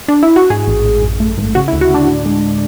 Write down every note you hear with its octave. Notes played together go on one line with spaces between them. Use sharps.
D4
E4
F#4
G#2 G#4
A1
A1
F#2
A3
G#1
C#3 F#4
E4
D2
F#4
D2 D4
A2
G#3